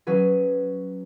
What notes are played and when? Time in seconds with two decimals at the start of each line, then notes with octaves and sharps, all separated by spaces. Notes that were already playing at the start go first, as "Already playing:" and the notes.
0.07 F#3 C#4 G#4 B4